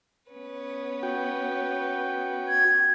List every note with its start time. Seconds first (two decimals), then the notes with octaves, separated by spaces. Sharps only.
0.31 B3 C#4 B4
1.03 F#4 G5
2.48 G#6